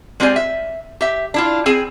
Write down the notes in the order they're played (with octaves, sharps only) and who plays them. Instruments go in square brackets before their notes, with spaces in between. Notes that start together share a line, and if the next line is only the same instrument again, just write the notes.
[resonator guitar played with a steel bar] G#3 C4 F4 G4 D5 G#5
E5
G4 E5
D4 E4 F4
C4 G#4 G#5